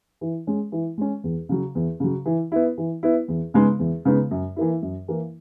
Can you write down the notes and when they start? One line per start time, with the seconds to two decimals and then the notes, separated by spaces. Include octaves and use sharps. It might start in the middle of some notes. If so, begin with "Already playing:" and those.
0.21 E3
0.47 G#3 C#4
0.72 E3
0.98 G#3 C#4
1.24 E2
1.49 C#3 F#3
1.75 E2
2.00 C#3 F#3
2.26 E3
2.52 B3 E4
2.78 E3
3.03 B3 E4
3.28 E2
3.54 C#3 G#3 B3 D#4
3.79 E2
4.05 C#3 G#3 B3 D#4
4.31 F#2
4.56 E3 A#3 E4
4.82 F#2
5.08 E3 A#3 E4